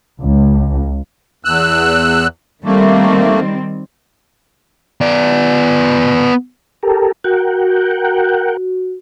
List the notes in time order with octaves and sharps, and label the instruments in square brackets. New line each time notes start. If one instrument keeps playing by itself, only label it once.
[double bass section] C#2
[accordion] E2 E6 F#6
[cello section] D#3 G3 C4 [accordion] A3 A#3
[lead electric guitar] B3 D5
[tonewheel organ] G4 A4 A#4
[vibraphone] F#4 [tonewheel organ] A#4 F#5 G5